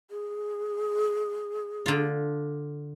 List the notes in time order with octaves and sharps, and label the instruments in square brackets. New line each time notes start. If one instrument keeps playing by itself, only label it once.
[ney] G#4
[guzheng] D3 F4